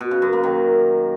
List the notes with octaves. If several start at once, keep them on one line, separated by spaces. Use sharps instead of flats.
B2
C#3
F#2
A#3
D#3